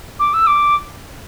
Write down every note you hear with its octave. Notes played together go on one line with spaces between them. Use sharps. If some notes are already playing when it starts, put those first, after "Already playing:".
D6
E6
D6